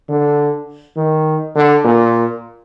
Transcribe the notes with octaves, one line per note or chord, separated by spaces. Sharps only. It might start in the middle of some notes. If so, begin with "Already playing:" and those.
D3
D#3
D3
A#2